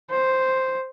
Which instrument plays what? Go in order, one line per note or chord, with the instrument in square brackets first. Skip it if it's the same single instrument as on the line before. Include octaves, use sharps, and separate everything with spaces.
[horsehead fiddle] C5